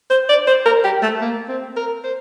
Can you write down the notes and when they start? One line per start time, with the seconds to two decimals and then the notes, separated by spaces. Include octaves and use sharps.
0.10 C5
0.29 D5
0.47 C5
0.66 A#4
0.84 G4
1.03 A3
1.21 A#3
1.48 C4
1.77 A#4
2.04 C5